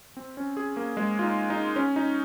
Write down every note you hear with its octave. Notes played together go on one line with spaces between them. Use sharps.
C4
C#4
G#4
A#3
G#3
F4
D#4
D#4
C#4
D#4